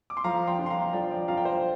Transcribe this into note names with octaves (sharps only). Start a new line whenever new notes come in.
D6
C6
F3 F5 A#5
G5 C6
D4 F4
C6
F5 A#5
F3 D5 G5
D5 G5
D4 F4 F5 A#5
G5
C5 F5